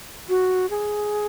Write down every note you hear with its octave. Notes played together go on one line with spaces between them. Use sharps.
F#4
G#4